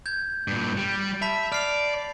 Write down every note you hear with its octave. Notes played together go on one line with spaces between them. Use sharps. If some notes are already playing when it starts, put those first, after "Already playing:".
G6 G#6
G2 A#2
G3
E5 A5 B5 B6
D5 F6 C7 F7